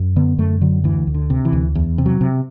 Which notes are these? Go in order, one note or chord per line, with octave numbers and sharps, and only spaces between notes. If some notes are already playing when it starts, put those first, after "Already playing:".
Already playing: F#2
D3 B3
F#2 A3
D3 F#3
D2 E3
D2
D3
C3
E3
D2
E2
C3
F#3
C3